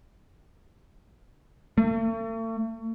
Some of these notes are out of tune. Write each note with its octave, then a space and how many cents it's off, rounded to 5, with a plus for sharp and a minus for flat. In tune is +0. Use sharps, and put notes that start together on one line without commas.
A3 +40